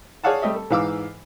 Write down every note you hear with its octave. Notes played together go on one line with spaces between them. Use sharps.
G#4 C#5 D5 F5 F#5 A5
G3 A3 G4 D#5 E5
A4
G#2 E3 F5 D6 E6